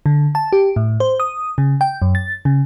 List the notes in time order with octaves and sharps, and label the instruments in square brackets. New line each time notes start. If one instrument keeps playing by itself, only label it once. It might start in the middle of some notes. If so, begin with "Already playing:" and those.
[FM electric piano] D3
A5
G4
A2
C5
D#6
C#3
G5
F#2
A6
C#3